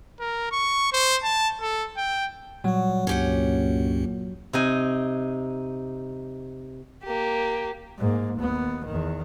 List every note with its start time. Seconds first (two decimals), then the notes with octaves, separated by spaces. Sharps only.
0.20 A#4
0.52 C#6
0.93 C5
1.23 A5
1.61 A4
1.97 G5
2.64 A#2 F#3 G3
3.07 C#2 G2 A#2 C#4 G4 F#5
4.53 C3 D#4 G#5
7.05 A#3 G4
7.99 G#2 A#3
8.39 D#2 B3
8.86 E2 D#3